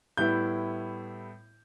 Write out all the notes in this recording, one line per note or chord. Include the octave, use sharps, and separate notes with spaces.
A2 G3 B3 E4 G6